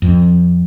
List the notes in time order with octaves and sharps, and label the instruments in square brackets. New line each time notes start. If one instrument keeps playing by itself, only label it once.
[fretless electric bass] F2